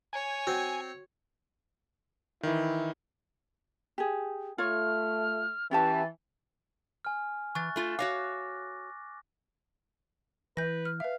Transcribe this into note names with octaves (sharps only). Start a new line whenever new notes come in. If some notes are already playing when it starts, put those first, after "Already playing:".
C#5 G#5
C4 F#4
D#3 E3 E4
G4 G#4
A3 F4 C#5 F6
E3 C#4 G4 A5 A6
G#5 F6
E3 C#6 F#6 A6
A3 F4
F#4 C#5 F5 D6 A#6
E3 B4 G6 A#6
F6
B4 E5 F5